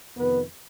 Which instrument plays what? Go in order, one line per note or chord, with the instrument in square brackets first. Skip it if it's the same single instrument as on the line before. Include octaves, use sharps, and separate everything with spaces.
[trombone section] F2 C3 D#3 B3 B4